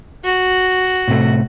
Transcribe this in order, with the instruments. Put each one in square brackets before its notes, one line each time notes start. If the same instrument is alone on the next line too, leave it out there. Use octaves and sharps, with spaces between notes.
[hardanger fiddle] F#4
[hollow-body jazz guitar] A2 C3 A3